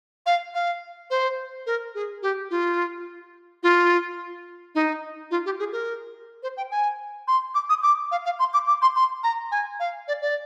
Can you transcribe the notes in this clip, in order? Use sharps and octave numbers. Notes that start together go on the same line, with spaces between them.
F5
F5
C5
A#4
G#4
G4
F4
F4
D#4
F4
G4
G#4
A#4
C5
G5
G#5
C6
D6
D#6
D6
F5
F5
C6
D6
D6
C6
C6
A#5
G#5
F5
D5
D5